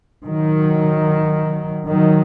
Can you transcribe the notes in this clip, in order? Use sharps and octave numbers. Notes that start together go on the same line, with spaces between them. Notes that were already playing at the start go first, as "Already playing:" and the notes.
D#3 F#3
D#3 F#3